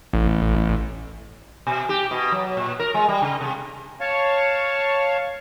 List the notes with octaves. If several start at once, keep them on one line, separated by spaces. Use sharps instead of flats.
A1
B2
G4
B2
F#3
A#2
A#4
G#3
G3
C#3
C3
C#5 F5 A5 C#6